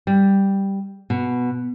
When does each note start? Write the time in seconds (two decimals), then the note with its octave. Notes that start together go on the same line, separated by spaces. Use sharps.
0.07 G3
1.10 B2